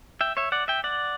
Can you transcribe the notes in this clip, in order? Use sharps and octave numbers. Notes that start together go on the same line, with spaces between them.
E5 G5
C#5 E5
D5 F#5
E5 G5
D5 F#5